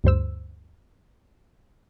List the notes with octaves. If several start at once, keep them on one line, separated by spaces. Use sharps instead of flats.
D2 G2 C5 E6